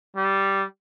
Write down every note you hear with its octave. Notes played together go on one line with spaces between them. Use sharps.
G3